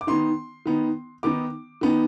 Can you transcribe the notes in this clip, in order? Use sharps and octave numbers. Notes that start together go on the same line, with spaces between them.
D6
D#3 B3 D#4 C6
D#3 B3 D#4
D#3 B3 D#4 D6
D#3 B3 D#4